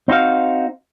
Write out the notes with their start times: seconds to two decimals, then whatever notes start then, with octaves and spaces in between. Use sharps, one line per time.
0.08 C4 D#4 F#4 F5